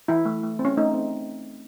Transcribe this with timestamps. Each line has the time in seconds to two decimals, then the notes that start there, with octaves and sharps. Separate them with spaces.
0.08 E3 E4
0.25 A3
0.43 A3
0.59 C4
0.65 C#4
0.77 A3 D#4
0.93 C4